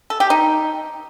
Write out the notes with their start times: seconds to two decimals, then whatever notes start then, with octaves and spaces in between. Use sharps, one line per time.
0.10 A4
0.20 G4
0.30 D#4